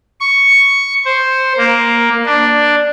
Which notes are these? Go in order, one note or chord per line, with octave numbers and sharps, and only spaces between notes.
C#6
C5
A#3
D4